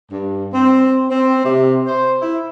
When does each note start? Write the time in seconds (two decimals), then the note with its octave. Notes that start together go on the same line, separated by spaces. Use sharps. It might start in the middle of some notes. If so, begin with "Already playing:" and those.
0.10 G2
0.53 C4
1.10 C4
1.43 C3
1.87 C5
2.20 E4